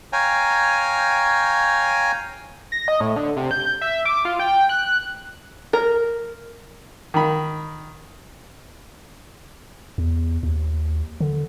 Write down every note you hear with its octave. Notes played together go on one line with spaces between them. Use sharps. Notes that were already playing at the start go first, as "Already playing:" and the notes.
C#5 F5 G5 G#5 A#5
A#6
D#5
A2
D3
C3
G6
E5
D6
F4
G5
F#6
A#4
D#3 B5
E2
D#2
D3